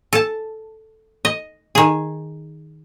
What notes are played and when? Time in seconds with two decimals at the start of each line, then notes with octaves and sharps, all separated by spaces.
0.13 A4 A5
1.25 D#5
1.75 D#3 G#4